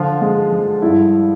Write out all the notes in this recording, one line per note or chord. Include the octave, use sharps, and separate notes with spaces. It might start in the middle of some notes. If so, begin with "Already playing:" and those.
Already playing: D3 F3 F4
G#3
F3
G2 E4